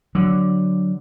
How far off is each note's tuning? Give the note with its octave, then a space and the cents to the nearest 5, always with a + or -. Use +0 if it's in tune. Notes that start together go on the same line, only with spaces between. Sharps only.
D3 +0 F#3 +0